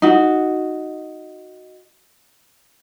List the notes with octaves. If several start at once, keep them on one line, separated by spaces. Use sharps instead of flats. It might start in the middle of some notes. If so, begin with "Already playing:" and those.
D#4 F#4